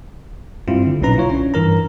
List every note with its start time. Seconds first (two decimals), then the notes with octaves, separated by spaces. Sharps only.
0.68 G2 G3 C4 E4 F4
0.86 D3
1.01 B1 A#2 C#4 D#4 B4 A#5
1.16 E4 F4 C#5
1.30 C#4 D4
1.54 G2 E3 A#4 A#5